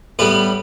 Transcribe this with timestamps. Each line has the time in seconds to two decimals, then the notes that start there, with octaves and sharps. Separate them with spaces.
0.19 A2 G3 B3 B4